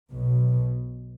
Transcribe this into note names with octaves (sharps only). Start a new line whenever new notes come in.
B1 B2